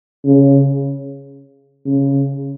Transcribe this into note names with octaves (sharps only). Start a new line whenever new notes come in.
C#3
C#3